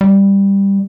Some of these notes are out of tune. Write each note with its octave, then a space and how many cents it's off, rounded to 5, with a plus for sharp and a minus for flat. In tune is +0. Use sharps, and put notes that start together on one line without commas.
G3 +10